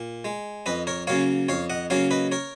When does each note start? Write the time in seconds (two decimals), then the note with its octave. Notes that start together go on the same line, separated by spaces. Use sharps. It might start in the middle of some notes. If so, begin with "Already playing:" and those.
Already playing: A#2
0.25 G#3
0.66 F2 B4 D#5
0.87 A#4 C#5
1.07 C#3 F#3 A#3 C#5 F5
1.48 F2 C#5 F5
1.70 D#5 F#5
1.90 C#3 F#3 A#3 C#5 F5
2.11 B4 D#5
2.32 A#4 C#5